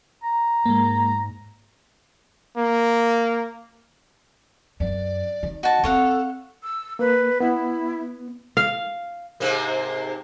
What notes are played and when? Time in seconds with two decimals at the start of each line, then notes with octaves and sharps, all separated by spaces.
0.23 A#5
0.66 G#2 G#3 A#3
2.57 A#3
4.80 F#2 D5
5.43 D#3
5.63 F#4 D#5 A5
5.84 C4 A4 C#5 F5 F#5
6.63 E6
6.99 A#3 B4
7.40 B3 E4
8.57 F5
9.40 G#2 C3 A#3